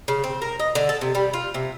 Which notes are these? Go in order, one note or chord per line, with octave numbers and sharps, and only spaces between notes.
C#3
C4
A#4
D#5
D3
A4
C3
G3
F4
C3